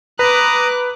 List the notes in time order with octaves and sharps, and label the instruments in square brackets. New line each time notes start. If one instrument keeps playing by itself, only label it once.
[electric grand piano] B4 [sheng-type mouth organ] A#5 D#6 [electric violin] D6 F#6